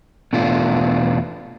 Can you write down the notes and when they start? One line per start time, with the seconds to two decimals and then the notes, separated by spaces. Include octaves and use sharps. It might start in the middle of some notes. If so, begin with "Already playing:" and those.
0.33 E2 B2 A3 D4 F4